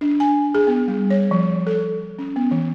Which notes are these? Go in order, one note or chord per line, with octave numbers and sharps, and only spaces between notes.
D4
G#5
G#4
B3
G3
C#5
F3
A4
C#4
B3
E3